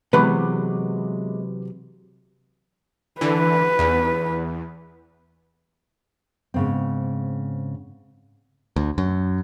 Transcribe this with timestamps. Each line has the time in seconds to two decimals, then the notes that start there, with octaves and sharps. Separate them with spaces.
0.13 C3 E3 F#3 G#3 B3 A#4 B4 D6
3.21 D3 E3 B4
3.79 E2
6.54 G#2 C#3 B3 C4
8.76 D2
8.98 F#2